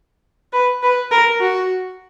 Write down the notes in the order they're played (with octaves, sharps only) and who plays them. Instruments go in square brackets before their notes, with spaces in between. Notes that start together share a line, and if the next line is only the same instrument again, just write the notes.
[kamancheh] B4
B4
A#4
F#4